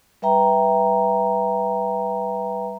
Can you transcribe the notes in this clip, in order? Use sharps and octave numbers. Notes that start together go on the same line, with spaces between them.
G3 B4 E5 G5 A#5